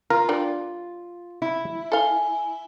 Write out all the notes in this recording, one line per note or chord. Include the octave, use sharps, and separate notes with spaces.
F4 A#4
G3 D4 D5
E4
A4 F5 G#5 G7